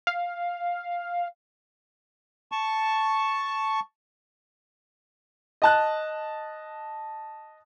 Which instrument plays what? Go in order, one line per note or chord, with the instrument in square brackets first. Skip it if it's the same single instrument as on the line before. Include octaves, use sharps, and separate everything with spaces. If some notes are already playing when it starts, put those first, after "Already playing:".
[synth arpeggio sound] F5
[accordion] A5 C#6
[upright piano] D#5 A5 F#6